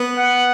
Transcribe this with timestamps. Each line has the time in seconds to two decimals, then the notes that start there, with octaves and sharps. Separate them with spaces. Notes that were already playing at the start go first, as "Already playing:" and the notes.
Already playing: B3
0.18 F#5